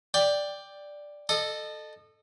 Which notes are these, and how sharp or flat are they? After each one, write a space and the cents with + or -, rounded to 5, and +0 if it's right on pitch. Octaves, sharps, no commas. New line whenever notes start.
D5 +0 G5 +10
A4 +0 D#5 -30